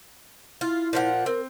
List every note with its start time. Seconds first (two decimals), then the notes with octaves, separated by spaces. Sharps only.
0.61 E4 F4
0.93 A#2 F3 F#5
1.26 C4 A#4